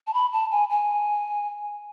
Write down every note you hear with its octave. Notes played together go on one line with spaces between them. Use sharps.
A5
B5
A5
G#5
G#5